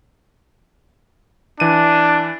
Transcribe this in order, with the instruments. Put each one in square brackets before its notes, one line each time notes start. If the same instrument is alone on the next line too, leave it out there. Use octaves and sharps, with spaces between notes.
[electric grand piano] E3 D#7 [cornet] D4